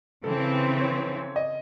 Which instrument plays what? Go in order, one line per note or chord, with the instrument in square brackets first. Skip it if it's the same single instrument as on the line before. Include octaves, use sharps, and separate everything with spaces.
[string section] C#3 E3 C4 [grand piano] A4
[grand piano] C#5
D#5